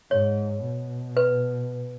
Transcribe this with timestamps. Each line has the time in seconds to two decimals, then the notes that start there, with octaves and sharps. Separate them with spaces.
0.10 G#2 C#5
0.64 B2
1.17 B4